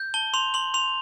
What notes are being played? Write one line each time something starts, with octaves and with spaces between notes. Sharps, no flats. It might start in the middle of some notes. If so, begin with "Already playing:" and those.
Already playing: G6
A5 G7
C6 F7
C6 F#7
C6 F7